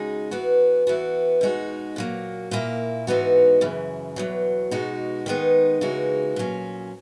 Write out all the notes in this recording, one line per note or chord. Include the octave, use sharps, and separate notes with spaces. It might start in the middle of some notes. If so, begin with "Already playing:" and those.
Already playing: C#3 G#3 D#4 F#4
E3 B3 F#4
E3 B3 F#4
B2 G#3 D#4 F#4
A#2 F#3 A#3
A#2 A#3 E4
G#2 E3 B3 D#4 F#4
F#2 C#3 E3
E2 B2 F#3
B2 G#3 D#4 F#4
D#3 G#3 B3 D#4
C#3 E3 G#3 D#4 F#4
A#2 F#3 C#4